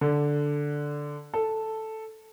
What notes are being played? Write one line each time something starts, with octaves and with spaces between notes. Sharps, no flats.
D3
A4